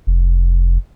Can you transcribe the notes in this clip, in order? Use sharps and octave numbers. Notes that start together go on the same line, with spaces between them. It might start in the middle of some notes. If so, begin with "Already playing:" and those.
F1